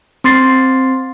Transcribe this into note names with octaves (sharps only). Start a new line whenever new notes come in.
C4 C6 A6 C7